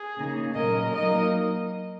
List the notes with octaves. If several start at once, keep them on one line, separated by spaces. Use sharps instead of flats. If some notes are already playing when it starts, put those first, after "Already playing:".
Already playing: G#4
C#3 A#3 D#4
A#2 F#3 C#4 A#4 D#5
F#3 A#3 D#4 A#4 D#5